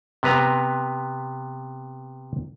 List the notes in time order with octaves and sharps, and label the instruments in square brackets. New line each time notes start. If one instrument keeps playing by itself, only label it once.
[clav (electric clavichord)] C3 B3 B4 A#5